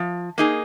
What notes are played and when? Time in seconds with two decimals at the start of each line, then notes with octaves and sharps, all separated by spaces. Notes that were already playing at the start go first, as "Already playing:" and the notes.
Already playing: F3
0.38 A#3 D#4 G#4